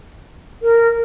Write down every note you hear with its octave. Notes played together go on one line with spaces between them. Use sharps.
A#4